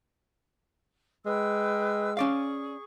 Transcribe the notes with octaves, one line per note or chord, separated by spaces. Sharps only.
G#3 B4 G5 E6
C#4 G#4 D5 F5 C#6